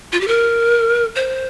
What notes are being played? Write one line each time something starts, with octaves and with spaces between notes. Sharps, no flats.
F4
G4
A#4
C5